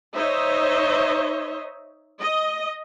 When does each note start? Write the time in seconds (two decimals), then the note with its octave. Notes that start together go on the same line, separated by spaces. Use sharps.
0.14 D#4 C5 C#5 D#5 E5
2.22 D#5